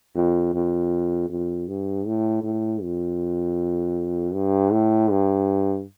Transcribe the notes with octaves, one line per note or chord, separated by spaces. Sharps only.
F2
F2
F2
G2
A2
A2
F2
G2
A2
G2